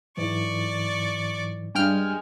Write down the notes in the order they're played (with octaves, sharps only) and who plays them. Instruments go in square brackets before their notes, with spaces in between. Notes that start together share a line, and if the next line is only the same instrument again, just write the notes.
[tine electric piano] G#2 E3 F#3 [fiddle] D5 C#6
[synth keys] G2 G5 F6 [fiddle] G#3 [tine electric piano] G#5